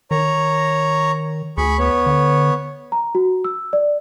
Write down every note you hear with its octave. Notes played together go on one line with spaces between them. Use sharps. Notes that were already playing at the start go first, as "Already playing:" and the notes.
D#3 C#5 A#5
D2 G#4 B5 C#6
B3 C#5
D3
A#5
F#4
E6
D5